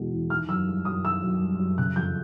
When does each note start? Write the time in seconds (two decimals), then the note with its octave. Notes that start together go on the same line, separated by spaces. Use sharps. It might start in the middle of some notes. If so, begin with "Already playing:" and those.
Already playing: E2 B2 G#3
0.12 E2
0.30 D#3 F6
0.48 F#2 E6
0.67 G3
0.85 F#2 D#6
1.05 D#3 E6
1.23 F#2
1.41 G3
1.59 F#2
1.78 C#3 F#6
1.96 F2 G6